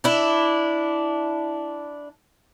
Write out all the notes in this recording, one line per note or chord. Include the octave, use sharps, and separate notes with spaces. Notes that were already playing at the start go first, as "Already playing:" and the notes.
D4 E4